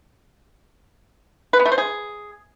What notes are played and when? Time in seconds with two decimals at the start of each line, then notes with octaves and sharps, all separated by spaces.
1.53 B4
1.59 B3
1.66 A3
1.72 C5
1.78 G#4